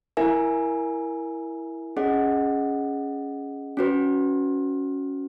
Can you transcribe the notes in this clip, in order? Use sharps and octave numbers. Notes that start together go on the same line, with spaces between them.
E4 A#4 E5 G#5
C#4 G#4 D#5 F#5
C#4 F#4 B4